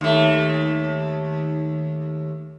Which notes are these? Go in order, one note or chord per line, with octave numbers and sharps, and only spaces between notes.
D#2 A3